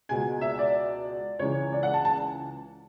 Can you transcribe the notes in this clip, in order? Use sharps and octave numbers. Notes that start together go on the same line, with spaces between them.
C#2 B2 G#3 G#5
E5
D5
C#2 C#3 E3 C#5
D5
F#5
A5
A5